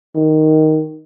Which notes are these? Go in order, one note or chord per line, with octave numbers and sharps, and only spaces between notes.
D#3